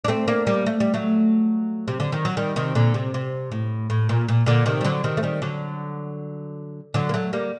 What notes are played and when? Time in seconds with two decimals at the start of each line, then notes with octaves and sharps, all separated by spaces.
0.05 D4
0.08 A3 C4
0.28 A#3 D4
0.47 G3 A#3
0.66 A3
0.80 G3
0.94 F#3 A3
1.88 C3
2.00 D3
2.12 D#3
2.25 F#3
2.37 D#3 G3
2.56 C3 D#3
2.75 A#2 D3
2.94 C3
3.14 C3
3.52 A2
3.90 A2
4.09 A#2
4.28 A#2
4.46 A#2 D3
4.66 C3 D#3
4.81 G3
4.85 D3 F#3
5.04 C3 D#3
5.17 A3
5.23 D#3 G3
5.42 D3 F#3
6.94 D3 F#3
7.09 A#3
7.14 F#3 A3
7.33 G3 A#3